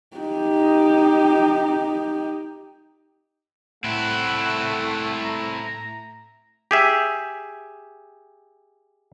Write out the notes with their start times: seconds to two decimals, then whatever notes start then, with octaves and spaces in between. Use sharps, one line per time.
0.16 D#4 G4
3.84 A2 A3 C4 E4 F#5
5.24 A#5
6.71 G4 G#4 E5